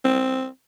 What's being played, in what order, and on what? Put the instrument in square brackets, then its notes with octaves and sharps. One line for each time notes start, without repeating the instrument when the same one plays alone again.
[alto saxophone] C4